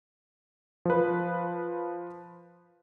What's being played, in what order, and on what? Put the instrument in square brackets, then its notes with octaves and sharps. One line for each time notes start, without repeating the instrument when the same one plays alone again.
[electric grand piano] F3 B4